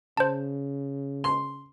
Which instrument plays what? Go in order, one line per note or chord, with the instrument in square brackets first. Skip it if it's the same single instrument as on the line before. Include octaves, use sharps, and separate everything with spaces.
[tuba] C#3 [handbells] C5 A5
[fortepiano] C6